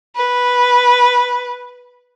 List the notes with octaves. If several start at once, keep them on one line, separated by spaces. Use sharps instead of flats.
B4